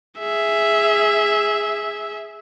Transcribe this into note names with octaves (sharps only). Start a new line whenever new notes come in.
G#4 E5